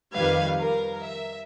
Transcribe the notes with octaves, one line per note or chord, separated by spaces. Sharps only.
F2 D#3 G3 B4 F5 G#6
A#4
E5